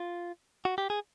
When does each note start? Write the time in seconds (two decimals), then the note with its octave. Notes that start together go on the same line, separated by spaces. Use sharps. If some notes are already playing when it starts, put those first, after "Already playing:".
Already playing: F4
0.65 F#4
0.78 G4
0.90 G#4